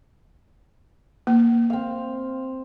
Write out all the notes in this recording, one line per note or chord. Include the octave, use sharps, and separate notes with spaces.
A#3
C4 F5